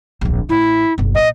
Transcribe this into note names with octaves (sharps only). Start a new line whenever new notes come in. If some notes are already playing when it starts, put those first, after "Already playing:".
D1 A#1
A1 E4
F#1 B1
A#2 D#5